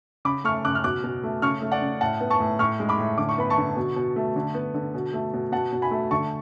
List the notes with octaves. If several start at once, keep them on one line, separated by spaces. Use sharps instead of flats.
C#3 B5 D6
A3 C#6 F6
C#3 D6 F#6
F6
B2 D6 F#6
B2
A3
C#3 C#6 F6
A3
D5 F#5
C#3
A2 F#5 A5
B3
A5 C#6
A2
A2 C#6 F6
G#3
B5 D6
A2
D3 D6
C#6
B3 B5
A5 C#6
D3
B2
B2
A3
D3
B3
D3
B2
A3
B2
B2 F#5 A5
B2
G#5 B5
A3
D3 A5 C#6